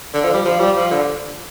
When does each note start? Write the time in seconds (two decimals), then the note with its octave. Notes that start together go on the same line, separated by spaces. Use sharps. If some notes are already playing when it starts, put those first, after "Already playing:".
0.13 D3
0.24 F3
0.34 G3
0.45 F3
0.59 G3
0.76 F3
0.91 D3